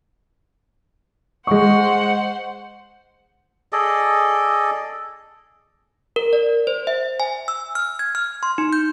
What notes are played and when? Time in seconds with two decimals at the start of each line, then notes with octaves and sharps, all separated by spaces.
1.47 G#3 C5 F#5 C#6
3.72 G#4 A4 D5 D#5
6.16 A#4
6.33 D5
6.67 C5
6.87 E5
7.20 G#5
7.48 E6
7.75 F6
7.99 G#6
8.15 F6
8.43 C6
8.58 D#4
8.73 G6